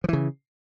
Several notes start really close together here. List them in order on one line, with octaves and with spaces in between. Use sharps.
F3 E3 C#3